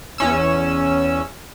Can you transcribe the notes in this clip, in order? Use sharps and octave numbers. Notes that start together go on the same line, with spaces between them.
E2 C#4 E6